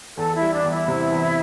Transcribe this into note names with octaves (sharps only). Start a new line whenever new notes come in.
E2 A4
E4
G3
D4
E2
E4
C3
E2